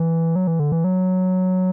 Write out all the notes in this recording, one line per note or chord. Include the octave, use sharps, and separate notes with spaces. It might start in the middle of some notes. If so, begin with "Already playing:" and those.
Already playing: E3
F#3
E3
D3
E3
F#3